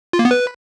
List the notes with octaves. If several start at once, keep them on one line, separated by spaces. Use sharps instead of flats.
F4
A#3
B3
B4